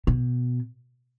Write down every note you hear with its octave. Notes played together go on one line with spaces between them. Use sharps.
B2